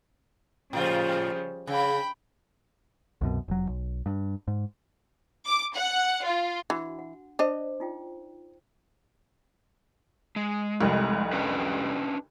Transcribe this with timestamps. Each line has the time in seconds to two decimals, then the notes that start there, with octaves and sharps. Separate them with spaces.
0.73 A2 C#3 F3 G3 F4
1.67 C#3 G5 B5
3.21 C2 F#2 B2
3.48 F1 F#3
3.69 B1
4.06 G2
4.48 G#2
5.46 D6
5.75 F#5
6.25 F4
6.70 E3 D4 F#4 F#5
6.99 F#5
7.39 D4 C5 D5 D#5
7.80 D#4 F4 G5
10.36 G#3
10.81 F1 C2
11.33 C#4 D4 B4